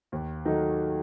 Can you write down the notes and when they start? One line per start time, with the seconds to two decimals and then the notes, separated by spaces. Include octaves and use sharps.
0.12 D#2
0.45 D#3 F#3 A3 D#4